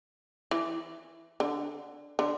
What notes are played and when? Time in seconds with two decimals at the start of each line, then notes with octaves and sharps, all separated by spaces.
0.51 E3
1.40 D3
2.19 D3